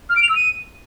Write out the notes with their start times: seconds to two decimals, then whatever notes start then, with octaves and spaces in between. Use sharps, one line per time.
0.09 F6
0.16 D7
0.23 F7
0.29 E6
0.36 D#7